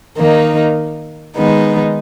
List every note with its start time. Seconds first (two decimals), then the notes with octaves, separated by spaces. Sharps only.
0.16 D#3 A#3 D#4
1.37 D#3 G#3 B3 D#4